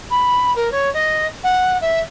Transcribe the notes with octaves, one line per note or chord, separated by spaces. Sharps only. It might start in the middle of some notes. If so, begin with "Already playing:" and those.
B5
A#4
C#5
D#5
F#5
E5